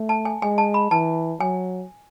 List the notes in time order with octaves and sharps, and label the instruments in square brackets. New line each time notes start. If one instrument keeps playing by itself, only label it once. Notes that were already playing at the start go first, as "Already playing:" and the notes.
Already playing: [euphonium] A3
[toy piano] A5
G#5
[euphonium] G#3 [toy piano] G#5
[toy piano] A5
B5
[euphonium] E3 [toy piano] A5
[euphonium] F#3 [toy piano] G#5